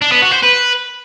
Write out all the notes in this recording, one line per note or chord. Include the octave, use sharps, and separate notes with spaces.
D4
B3
F#4
C5
B4